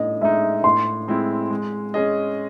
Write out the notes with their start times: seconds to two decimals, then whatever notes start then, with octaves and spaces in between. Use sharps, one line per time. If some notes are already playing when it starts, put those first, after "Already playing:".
Already playing: A2 D#5
0.21 G#3 D#4 E5
0.64 A2 C6
1.08 G#3 C4 E4
1.50 G#3
1.94 C#4 G#4 D#5